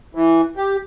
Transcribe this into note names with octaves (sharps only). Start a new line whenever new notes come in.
E3
G4